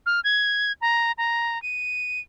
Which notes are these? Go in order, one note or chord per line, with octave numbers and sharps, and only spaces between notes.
F6
G#6
A#5
A#5
D#7